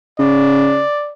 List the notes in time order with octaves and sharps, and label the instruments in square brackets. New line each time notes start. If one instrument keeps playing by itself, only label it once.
[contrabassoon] C#3 [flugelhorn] D5